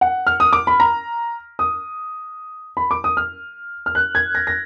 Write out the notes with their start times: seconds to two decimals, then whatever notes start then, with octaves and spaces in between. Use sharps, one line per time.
0.01 F#5
0.27 F6
0.40 D#6
0.53 D6
0.67 B5
0.80 A#5
1.59 D#6
2.77 B5
2.91 D6
3.04 D#6
3.17 F6
3.86 F6
3.95 F#6
4.15 G#6
4.35 A#6
4.47 A#6